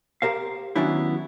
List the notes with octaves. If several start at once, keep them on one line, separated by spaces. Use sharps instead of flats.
G4 A#4 C5 F5
D#3 F#3 B3 C#4 D4 E4